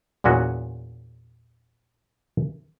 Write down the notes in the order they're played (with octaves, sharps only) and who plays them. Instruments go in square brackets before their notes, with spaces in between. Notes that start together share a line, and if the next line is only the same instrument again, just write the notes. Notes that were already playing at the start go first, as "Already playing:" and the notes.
[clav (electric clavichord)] E2 A#2 C#4 F#4 G#4